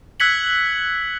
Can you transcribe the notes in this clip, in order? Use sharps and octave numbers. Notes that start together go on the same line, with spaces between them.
E6 F#6 G#6 B6 C#7 F#7